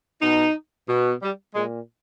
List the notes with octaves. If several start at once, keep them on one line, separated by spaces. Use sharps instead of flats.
B2 D#4
B2
G3
A#2 G#3